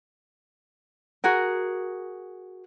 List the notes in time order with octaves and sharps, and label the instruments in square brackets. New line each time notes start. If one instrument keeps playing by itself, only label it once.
[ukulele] F#4 G#4 A#4